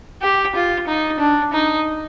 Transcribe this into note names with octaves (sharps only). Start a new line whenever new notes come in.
G4
F4
D#4
D4
D#4